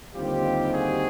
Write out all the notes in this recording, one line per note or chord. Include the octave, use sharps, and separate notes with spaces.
D#2 D3 G3 C4 D#4 F4 G4
F#4 G#4